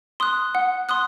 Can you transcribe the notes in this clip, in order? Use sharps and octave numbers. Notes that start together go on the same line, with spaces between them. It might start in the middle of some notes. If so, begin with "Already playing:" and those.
C6 D#6 F#6
F#5
C6 D#6 F#6